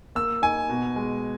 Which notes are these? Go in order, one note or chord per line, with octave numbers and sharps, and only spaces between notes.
A#3 E6
D#4 G#5
B2
G#3